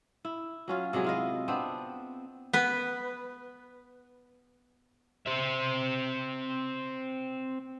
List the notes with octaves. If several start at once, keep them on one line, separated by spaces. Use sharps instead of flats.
E4
F#3 C#4 F4
C3 F#3 G#3 G#4
E4 F4 D#5
B3 C4 D4
B3 B4
C4 E5